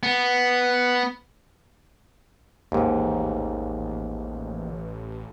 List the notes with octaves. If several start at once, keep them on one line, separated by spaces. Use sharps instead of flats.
B3
A1 D#2 G#2